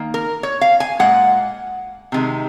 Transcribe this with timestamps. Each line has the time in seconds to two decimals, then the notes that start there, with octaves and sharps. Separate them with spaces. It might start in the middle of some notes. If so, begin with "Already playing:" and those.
Already playing: D#3 A#3
0.14 A#4
0.43 C#5
0.61 F5
0.80 G#5
0.99 A#2 G#3 F#5
2.12 C3 D#3 G#3